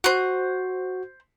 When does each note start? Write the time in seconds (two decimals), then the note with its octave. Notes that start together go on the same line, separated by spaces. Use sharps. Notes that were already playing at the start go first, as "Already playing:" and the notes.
0.04 F#4 C5 F#6